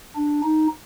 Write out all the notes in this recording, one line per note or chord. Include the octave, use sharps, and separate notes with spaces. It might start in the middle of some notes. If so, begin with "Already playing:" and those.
D4
D#4